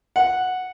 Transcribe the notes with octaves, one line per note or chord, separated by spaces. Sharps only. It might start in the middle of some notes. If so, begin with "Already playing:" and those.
F#5